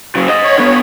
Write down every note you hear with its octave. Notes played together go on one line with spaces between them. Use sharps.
C#3 F#3
C5 D#5
C#5
D3 B3